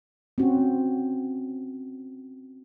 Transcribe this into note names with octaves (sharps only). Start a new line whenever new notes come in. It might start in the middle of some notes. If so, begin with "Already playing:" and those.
C4 C#4 F#4